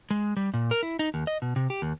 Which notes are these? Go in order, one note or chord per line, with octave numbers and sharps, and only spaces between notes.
G#3
G3
A#2
A#4
E4
D#4
D#2
D#5
B2
C3
G4
D#2